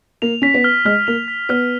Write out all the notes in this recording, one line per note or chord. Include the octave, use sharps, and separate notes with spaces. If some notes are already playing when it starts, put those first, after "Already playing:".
A#3 F7
C#4 B6
B3
F6
G#3 F6
A#3 F7
B6
B3 F6